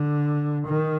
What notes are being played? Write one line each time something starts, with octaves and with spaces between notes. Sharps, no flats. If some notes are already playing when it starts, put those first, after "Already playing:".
Already playing: D3
D#3